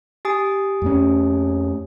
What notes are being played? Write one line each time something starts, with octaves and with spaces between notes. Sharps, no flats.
G4 G#5 D#6
F2 A3 C#4